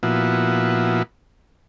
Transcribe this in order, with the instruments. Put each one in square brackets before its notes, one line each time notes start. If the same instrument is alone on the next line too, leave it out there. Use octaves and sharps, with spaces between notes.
[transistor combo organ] A#2 F3 B3 E4 F#4